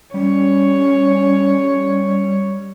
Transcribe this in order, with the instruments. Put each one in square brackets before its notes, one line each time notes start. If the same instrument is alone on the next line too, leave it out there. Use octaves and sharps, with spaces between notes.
[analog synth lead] G3 [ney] C#4 [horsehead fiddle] C#5